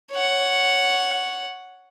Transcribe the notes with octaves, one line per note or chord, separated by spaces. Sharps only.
C#5 F#5